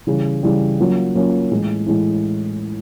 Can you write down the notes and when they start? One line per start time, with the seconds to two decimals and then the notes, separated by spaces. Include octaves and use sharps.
0.07 C#3 E3 G3
0.43 C#3 E3 G3
0.79 F#3 A#3 C#4 F4
1.15 F#3 A#3 C#4 F4
1.50 A2 E3 G#3
1.86 A2 E3 G#3